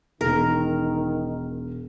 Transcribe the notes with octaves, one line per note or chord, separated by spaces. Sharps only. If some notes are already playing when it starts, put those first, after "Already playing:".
E1 D#3 A#4